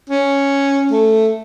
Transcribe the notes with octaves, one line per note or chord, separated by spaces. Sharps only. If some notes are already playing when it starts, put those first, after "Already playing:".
C#4
A3